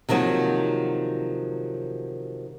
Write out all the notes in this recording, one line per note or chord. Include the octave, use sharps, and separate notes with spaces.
C3 D#3 F3 F#3 A#3